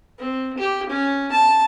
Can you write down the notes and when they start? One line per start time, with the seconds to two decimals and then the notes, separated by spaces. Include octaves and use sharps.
0.18 C4
0.58 G4
0.90 C#4
1.32 A5